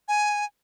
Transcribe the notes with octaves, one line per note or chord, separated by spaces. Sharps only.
G#5